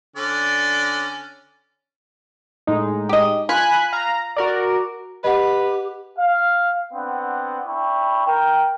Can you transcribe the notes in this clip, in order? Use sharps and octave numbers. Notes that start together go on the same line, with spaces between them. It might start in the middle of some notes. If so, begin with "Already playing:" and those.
D3 C#4 D5
A2 G#3 D#4
G4 D#5
F4 G#5 B5 F#6
F5 A#5
F#4 A#4 D5
G4 B4 D#5 F#5
F5
B3 C4 D4 F#5
D4 E4 G5 B5 C#6
A#4 G5